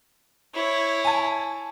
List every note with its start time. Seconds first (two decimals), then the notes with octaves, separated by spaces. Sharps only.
0.54 E4 C#5
1.05 G#5 A5